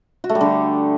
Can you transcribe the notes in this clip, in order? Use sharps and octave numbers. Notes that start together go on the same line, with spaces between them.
F#4
A3
G3
D3